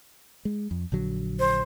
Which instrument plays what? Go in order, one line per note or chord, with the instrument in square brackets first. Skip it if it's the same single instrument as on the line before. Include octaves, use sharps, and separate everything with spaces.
[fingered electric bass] G#3
F2
A#1 D3 F#3
[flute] C5